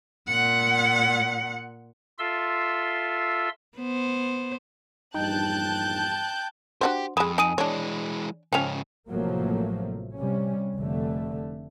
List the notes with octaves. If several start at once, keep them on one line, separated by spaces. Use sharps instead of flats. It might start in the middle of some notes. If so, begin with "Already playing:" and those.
A#2 F#5
F4 A4 E5 C6 E6
B3 C5
A#1 E2 G2 D#4 G5 A5 F#6 G6
D4 F#4 G4 C5
F2 G#3 G#5 B5 D#6
D#4 G#5 D#6 D#7
E3 G#3 D4 C#5
G#2 C#3 F3 C#4 G5 F7
A1 C3 F3 F#3 A3 A#3
C3 G3 C#4
F1 D3 A3